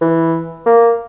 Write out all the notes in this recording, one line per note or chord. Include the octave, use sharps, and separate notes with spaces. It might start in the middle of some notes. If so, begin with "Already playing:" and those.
E3
A#3